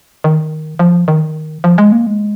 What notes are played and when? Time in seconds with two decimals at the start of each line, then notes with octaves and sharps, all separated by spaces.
0.24 D#3
0.79 F3
1.08 D#3
1.64 F3
1.78 G#3
1.92 A#3
2.07 G#3